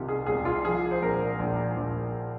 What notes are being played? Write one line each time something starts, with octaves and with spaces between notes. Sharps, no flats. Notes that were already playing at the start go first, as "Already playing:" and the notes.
Already playing: C2 C3 D#3 F4 G4
G#4
C2 G#4
F4
F3 G#4
C5
A#1 A#4
A#1
A#1